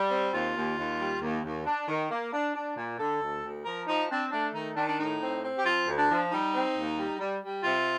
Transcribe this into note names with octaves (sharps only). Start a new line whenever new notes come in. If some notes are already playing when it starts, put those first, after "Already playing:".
Already playing: G3
C4
D#2 F4
D#2
D#2
G3
D#2
D#2
D4
D#3
A#3
D4
D4
A#2
D3 A4
D2
D2
F3 A#4
F3 D#4
C4 D4
A3 D4
D#3 D#4
D#3 D4
D4
A2 D#4
C4
C4
G4
F3 F4
D2
D4
F3
G3 D#4
C4
D#2
G3
G3
G3
C3 F4